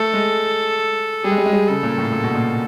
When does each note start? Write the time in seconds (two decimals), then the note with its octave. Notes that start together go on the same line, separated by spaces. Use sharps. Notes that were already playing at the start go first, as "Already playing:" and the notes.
Already playing: A3 A4
0.14 G#3
1.24 G3 G#4
1.32 G#3
1.38 G3
1.46 G#3
1.53 G3
1.68 C#3 A4
1.83 A#2
1.98 A2
2.12 A#2
2.24 B2
2.35 A#2